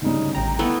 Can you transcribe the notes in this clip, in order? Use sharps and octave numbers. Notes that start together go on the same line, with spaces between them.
D2 G2 C#3 D#4
A1 G5 A#5
A3 B3 E4